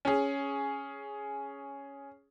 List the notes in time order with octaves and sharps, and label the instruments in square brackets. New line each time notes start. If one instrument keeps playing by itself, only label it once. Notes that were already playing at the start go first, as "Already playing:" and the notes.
[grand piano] C#4 G#4